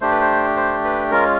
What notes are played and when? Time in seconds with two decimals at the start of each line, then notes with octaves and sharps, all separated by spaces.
0.01 A3 D4 G4 C5
0.11 B4
0.21 C5
0.57 C5
0.84 B4
1.11 G#3 C#4 F4 A#4